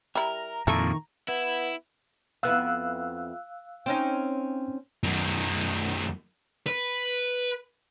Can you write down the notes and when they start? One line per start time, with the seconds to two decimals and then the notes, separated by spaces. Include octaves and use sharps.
0.15 G3 E4 A#4 A#5
0.67 F2 A#2 D#3 E4 A4 C#6
1.28 B3 E4
2.43 F2 B3 E4 F5 E6 F#6
3.86 C4 C#4 D#4
5.04 F#2 D#3
6.66 B4